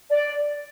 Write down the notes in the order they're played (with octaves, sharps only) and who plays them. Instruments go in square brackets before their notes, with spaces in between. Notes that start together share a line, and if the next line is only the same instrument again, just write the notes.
[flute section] D5